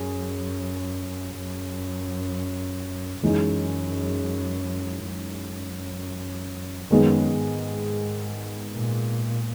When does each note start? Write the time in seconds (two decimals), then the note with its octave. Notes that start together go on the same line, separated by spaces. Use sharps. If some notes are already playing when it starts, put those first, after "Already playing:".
Already playing: F#2 G#4
1.37 F#2
3.22 F#2 E3 G#3 D#4 G#4
5.06 F#2
6.91 F#2 D#3 G#3 B3
7.37 G#2
8.75 A#2